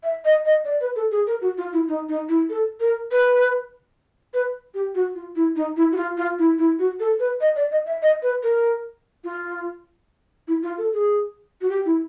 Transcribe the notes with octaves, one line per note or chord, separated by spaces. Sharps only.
E5
D#5
D#5
D5
B4
A4
G#4
A#4
F#4
F4
E4
D#4
D#4
E4
A4
A#4
B4
B4
G4
F#4
F4
E4
D#4
E4
F#4
F4
F4
E4
E4
F#4
A4
B4
D#5
D5
D#5
E5
D#5
B4
A#4
F4
E4
F4
A4
G#4
F#4
G4
E4